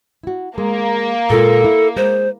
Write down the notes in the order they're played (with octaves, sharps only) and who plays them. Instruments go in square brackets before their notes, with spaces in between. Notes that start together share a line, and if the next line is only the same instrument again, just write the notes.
[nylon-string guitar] E4 F#4
[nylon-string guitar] G#3 [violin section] A#3
[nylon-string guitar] A#2 G#3 F4 [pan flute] A4
[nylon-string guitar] E4
[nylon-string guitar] G#3 [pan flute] C5